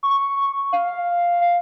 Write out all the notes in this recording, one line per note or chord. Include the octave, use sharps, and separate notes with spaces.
C#6
F5